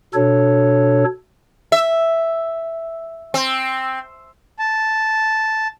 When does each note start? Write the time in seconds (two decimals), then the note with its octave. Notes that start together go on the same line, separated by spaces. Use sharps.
0.14 B2 D4 A4 C#5
1.72 E5
3.34 C4
4.59 A5